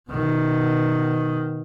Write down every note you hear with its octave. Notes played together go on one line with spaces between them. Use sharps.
B2 D#3